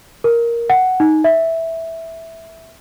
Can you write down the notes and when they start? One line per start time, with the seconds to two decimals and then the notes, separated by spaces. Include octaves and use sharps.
0.24 A#4
0.70 F#5
1.00 D#4
1.24 E5